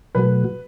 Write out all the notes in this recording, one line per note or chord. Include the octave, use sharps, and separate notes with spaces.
B2 F#3 A3 F#4 B4